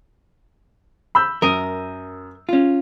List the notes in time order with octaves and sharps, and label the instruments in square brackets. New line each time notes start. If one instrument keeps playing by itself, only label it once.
[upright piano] B5 E6 G6
[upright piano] F#2 D#6 D#7 [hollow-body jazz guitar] A#4
[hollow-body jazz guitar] C#4 F4